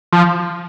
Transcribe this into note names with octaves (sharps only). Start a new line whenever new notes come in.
F3